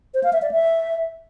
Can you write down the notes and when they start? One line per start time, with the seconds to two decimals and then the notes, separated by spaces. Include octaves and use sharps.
0.14 C5
0.23 F5
0.33 E5
0.42 D5
0.51 E5